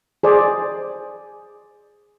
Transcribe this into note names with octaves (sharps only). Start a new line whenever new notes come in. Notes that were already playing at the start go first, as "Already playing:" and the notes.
G#4 C5 D5